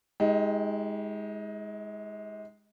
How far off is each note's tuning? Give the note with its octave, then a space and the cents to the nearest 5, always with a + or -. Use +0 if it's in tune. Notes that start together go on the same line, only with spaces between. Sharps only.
G#3 +0 D#4 +45 G4 +0